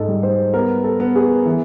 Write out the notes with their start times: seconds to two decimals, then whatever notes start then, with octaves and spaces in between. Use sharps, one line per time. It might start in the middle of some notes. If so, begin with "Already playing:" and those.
Already playing: G#2 A4
0.08 G3
0.23 C5
0.54 B3 A#4
0.84 A4
1.00 B3
1.16 G#4
1.46 E3